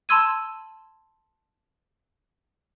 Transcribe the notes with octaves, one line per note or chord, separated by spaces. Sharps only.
A5 B5 C6 E6 G#6 D#7